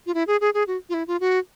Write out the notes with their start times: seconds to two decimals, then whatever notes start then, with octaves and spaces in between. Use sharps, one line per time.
0.07 F4
0.14 E4
0.27 G#4
0.41 G#4
0.54 G#4
0.67 F#4
0.89 F4
0.94 E4
1.07 F4
1.20 F#4